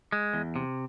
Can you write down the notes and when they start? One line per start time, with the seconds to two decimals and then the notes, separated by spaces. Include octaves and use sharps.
0.12 G#3
0.34 E2
0.56 C3